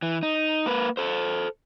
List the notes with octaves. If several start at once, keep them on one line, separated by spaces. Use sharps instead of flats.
E3
D#4
A#3 B4
A4 C5